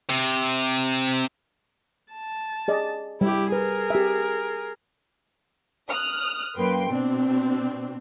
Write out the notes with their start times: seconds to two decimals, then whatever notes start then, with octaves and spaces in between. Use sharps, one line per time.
0.10 C3
2.13 A5
2.68 G#4 D5 D#5
3.21 G3 E4 G4
3.52 G#4 A#4 B4
3.90 G4 E5
5.89 D#6 F6 F#6
6.57 F#2 A#3 B4 G5 C6
6.89 B2 C4 D4